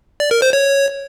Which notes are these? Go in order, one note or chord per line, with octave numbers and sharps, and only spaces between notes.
D5
A#4
C5
C#5